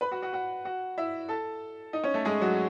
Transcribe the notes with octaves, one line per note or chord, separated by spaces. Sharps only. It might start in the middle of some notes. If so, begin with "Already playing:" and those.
B4 B5
F#4 F#5
F#4 F#5
F#4 F#5
F#4 F#5
E4 E5
A4 A5
D#4 D#5
C#4 C#5
A3 A4
G#3 G#4
F#3 F#4